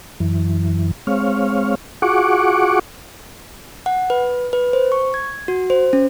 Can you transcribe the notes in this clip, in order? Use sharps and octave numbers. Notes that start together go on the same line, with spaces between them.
F#2 E3
G#3 C4 C#5 F5
F4 F#4 G#4 F#5 C#6 D6
F#5
B4
B4
C5
C#6
G#6
F#4
C5
C#4